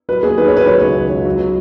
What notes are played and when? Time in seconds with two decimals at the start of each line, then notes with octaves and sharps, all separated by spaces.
0.09 F#3 B4
0.23 D#2 G#4
0.38 D#3 B4
0.48 C#5
0.52 D#3 B4
0.66 F#3 C#5
0.81 C#2
0.97 C#2
1.12 C#2
1.25 F#3
1.40 F#3